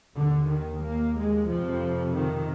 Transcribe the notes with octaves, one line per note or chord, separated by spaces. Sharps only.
D#2 D3
D#3
A#3
G#3
F2 C3 F3
D#3